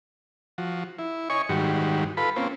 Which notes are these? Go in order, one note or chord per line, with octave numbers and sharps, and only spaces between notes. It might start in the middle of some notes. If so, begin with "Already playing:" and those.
F3 F#4
E4
C#5 D#5 G#5 C#6
G#2 D#3 G3 F#4
F4 A4 B4 B5
A#3 C4 C#4 F4